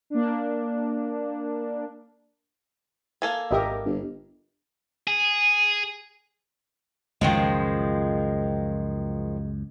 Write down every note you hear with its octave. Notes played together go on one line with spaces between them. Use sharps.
A#3 D4
A#3 A4 G#5
G#1 G4 A#4 D#5 E5
G1
G#4
C#2 F#2 D#3 F3 G#3